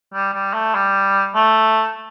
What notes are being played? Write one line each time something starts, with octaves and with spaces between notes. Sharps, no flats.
G3
G3
A3
G3
A3